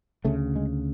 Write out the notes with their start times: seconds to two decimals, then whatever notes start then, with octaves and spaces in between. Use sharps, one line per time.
0.25 D2 C#3 A3
0.56 G#3